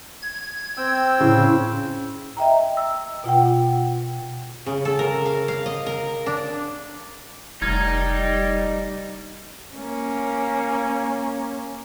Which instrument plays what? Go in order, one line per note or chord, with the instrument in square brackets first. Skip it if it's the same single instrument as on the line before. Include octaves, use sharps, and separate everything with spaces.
[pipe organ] G#6
[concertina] C4 G5 E6
[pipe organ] A2 [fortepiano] C#3
[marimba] D#5 E5 G5 A#5
E6
B2 F4 F#5 G5
[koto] C#3
A4
A#4
F5
F5
D#5
A#4
D4
[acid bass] F1 [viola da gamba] G3 [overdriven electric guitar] D#4 [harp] F6 G#6 A6
[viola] A#3 C#4